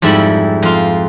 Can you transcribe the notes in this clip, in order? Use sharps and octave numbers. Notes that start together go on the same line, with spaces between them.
F2 G#2 G3 E4 E5 B5
F2 F4